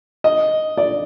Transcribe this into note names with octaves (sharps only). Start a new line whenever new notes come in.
D#5
D5